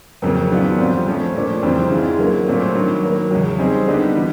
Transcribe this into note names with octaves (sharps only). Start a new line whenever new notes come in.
F2 C#3 F#3 A#3
D#3 F#3 B3 D4 F4
F2 D3 G3 C4 F4
F3 A3 C#4
A#2 F3 A3 D4
F2 C#3 E3 G3 C4
G#2 E3 G#3 C#4 F4
D3 F#3 A#3
A#2 F#3 A3 C4 F4
G2 D#3 F#3
D#3 F#3 A#3
E2 C#3 F#3
G3 C4 D#4 G#4
D3 G3 B3 D#4
E3 G3